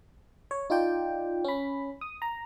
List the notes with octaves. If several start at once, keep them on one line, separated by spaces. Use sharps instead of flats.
C#5
D#4 F4 D5 G5
C#4 B5
D#6
A#5